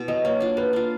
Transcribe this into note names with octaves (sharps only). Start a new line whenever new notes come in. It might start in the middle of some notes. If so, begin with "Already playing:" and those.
Already playing: B2 E4
F#3 B3 D#5
A#3 C#5
D4 F4
A#3 B4
D4 F4